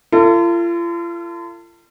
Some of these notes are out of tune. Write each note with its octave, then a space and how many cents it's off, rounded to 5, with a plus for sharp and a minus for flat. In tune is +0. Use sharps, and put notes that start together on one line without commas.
F4 -40 A4 +35